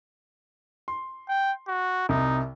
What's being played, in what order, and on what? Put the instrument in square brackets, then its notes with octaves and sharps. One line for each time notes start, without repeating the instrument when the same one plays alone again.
[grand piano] C6
[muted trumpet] G5
F#4
[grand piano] C2 C3 [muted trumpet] D#4